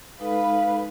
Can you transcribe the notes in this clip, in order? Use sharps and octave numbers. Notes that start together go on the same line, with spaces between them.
G#3 D#4 A4 B4 F5